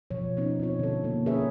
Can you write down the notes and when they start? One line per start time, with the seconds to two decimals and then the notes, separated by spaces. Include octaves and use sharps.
0.11 B2 F3 C#5
0.37 B3 C#4 D#4
0.60 B2 C4 F4 C#5
0.79 D3 A4
1.03 B2 D3 A#3
1.26 C#4 G#4 A#4 B4 C#5 E5